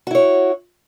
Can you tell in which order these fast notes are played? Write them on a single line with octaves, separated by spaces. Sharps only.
F#4 E4 C#5